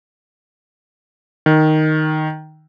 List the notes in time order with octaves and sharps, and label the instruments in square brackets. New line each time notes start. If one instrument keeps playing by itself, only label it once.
[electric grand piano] D#3